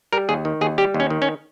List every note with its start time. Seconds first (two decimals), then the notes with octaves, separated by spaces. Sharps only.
0.13 G3 A#4
0.29 D#2 G#4
0.45 D#3
0.61 D#2 G#4
0.78 G3 G4
0.94 D#2
1.00 C#4
1.10 D#3
1.22 C#4